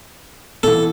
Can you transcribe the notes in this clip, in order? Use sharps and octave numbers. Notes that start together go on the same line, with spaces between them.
B2 E3 A4